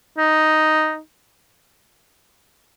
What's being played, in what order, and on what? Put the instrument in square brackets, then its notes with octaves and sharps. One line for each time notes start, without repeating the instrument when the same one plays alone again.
[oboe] D#4